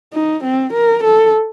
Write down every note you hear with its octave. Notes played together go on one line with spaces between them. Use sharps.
D#4
C4
A#4
A4